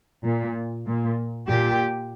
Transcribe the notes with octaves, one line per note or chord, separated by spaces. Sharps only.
A#2
A#2
A#2 G4